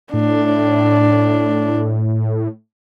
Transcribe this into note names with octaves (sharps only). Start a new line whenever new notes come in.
A2 D4